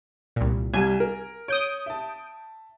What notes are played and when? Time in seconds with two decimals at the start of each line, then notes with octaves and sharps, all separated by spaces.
0.36 C2 A#2
0.74 C2 G3 G#5
1.00 A#4
1.48 C#5 D#6 G6 D7
1.86 E5 A5